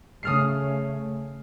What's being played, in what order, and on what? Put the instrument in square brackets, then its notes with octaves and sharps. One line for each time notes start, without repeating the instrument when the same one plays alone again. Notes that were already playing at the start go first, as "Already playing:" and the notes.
[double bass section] C#3 A3 C#4 [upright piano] D#6 F6 C7